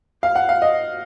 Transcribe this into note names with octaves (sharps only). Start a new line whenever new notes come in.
F5
F#5
F5
D#5